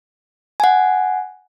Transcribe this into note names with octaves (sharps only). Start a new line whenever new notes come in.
F#5 G#5